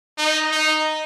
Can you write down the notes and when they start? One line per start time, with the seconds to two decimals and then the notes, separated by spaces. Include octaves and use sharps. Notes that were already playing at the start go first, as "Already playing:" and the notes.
0.18 D#4
0.52 D#4